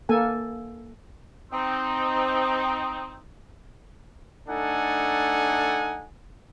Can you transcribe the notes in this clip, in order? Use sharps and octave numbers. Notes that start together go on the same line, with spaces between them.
A#3 A4 G#5
C4 D#4
A3 D4 D#4 A4 F#5 G#5